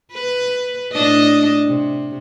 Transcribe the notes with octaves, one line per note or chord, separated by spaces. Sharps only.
B4
A2 D4 D#5
C3